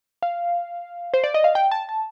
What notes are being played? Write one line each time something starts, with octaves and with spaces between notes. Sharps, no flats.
F5
C5
D5
D#5
F5
G5
A5
A5